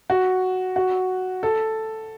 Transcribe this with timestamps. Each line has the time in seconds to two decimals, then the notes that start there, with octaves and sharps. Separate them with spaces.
0.10 F#4
0.76 F#4
1.43 A4